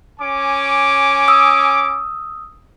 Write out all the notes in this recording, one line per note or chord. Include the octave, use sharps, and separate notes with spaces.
C#4 G#5 D6
D#6 E6